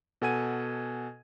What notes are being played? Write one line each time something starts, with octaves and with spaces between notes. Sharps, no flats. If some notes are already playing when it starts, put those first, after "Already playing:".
B2 A4 F#5 G#5 G#6 D#7